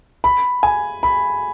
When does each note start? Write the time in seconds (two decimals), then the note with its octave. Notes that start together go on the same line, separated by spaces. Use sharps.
0.24 B5
0.63 G#5
1.03 B5